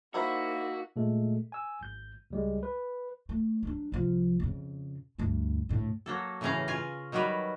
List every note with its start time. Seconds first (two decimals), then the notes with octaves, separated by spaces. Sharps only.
0.14 A#3 D#4 E4 F#4 A#4 C5 E6 B6
0.96 A#2 G#3 A3 A4
1.52 G#5 E6
1.81 G#1 G6
2.30 C#2 G3 G#3
2.63 B4
3.29 A3
3.63 F#3 D4
3.92 C2 F3
4.40 F2 C#3
5.18 D2 G2
5.69 D2 A2
6.06 F#3 A#3 A4
6.41 A2 C#3 E3 C#4 F5 A#5
6.68 C#4 F4 G#5
7.12 D#3 F#3 G3 A#4 B4